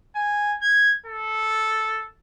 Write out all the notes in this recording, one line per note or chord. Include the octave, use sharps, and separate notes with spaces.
G#5
G#6
A4